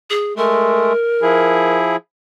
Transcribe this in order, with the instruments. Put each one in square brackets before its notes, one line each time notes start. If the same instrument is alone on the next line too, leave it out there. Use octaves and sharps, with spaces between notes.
[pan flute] G#4
[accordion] G#3 A3 [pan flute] A#4
[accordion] F3 E4 G#4